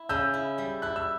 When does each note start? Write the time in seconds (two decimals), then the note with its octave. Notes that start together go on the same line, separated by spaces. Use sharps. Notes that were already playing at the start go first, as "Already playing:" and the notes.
Already playing: E4
0.09 C#3 E6 G6
0.34 E4
0.58 G3
0.82 E4 F#6
0.96 E6